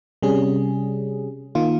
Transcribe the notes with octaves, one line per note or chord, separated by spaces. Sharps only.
C3 G3 C#4 G#4
D#3 A#3 F4